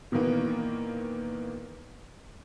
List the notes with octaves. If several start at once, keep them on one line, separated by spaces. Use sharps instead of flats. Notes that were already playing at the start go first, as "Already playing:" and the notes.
A#2 D#3 E3 A#3 B3